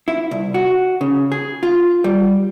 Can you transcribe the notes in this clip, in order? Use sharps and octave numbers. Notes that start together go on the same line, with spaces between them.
E4
C2
F#4
C#3
G#4
F4
G3